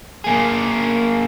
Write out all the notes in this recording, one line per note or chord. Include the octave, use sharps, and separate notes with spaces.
A#3 G#4